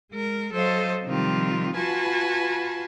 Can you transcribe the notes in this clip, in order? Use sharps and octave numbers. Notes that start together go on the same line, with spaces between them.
G#3 A#4
F#3 A4 C5 D#5 F5
C3 D#3 F3 G3 F4
F4 F#4 B4 G#5 A5 B5